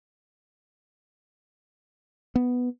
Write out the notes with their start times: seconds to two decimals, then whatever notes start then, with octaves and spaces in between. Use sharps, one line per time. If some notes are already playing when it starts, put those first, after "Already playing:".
2.35 B3